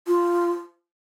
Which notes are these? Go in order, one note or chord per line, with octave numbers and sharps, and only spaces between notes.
F4